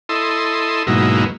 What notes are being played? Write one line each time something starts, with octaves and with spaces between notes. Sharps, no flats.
E4 A4 D#5 C6
G#2 B2 F#3 A#3 D#4 E4